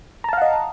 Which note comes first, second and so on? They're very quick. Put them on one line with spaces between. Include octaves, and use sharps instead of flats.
A#5 A5 F5 F#5 D#5